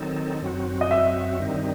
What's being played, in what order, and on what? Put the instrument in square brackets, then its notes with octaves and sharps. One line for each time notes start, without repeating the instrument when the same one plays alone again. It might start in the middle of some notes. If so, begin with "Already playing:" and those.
Already playing: [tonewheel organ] D#3 F#3 C4 D#4 A4
F#2 F#3 C4 F#4
[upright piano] D#5
E5
[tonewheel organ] G2 D#3 G3 C4 D#4